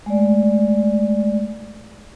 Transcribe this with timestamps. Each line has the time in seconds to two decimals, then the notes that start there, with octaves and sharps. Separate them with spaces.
0.06 G#3 A3 D5